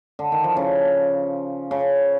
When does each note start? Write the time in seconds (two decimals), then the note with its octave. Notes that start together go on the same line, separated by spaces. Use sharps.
0.19 D3
0.32 D#3
0.44 F3
0.57 C#3
1.71 C#3